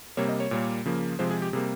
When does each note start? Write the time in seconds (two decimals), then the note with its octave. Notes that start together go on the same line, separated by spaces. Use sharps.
0.17 C3 G3 A#3 C#5
0.29 D#5
0.40 C#5
0.51 A#2 G3 A#3
0.86 C#3 F3 A#3
1.19 C3 F3 G#3 C5
1.30 G#4
1.42 G4
1.53 C3 G3 A#3 G#4